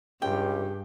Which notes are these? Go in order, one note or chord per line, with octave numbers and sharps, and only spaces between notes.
C#2 G2 G4 G5